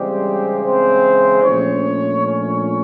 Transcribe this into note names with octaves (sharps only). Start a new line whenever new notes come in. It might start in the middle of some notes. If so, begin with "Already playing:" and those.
Already playing: C#3 E3 G3 G#3 C4 G4
C4 C5
A#2 F3 A3 C#4 D4 C#5
C#4 C#5